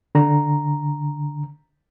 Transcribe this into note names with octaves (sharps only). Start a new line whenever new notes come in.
D3 A#5